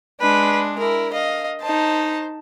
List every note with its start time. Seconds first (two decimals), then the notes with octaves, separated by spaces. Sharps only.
0.21 G#3 D4 B4
0.79 E4 A#4
1.13 D#5 F5
1.62 D#4 C5 A5